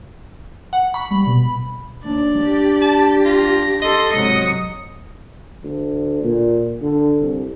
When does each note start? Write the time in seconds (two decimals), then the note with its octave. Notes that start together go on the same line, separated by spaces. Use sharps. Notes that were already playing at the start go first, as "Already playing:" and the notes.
0.73 F#5
0.94 B5 C#6
1.11 G3
1.26 B2
2.04 D#2 D4 D5
2.39 G4
2.82 A5
3.25 F4 A#6
3.82 A4 D#5 C6
4.12 G#2 C3 F#3 D#5 D#6 C#7
5.63 D2
6.23 A#2
6.81 D3
7.19 C2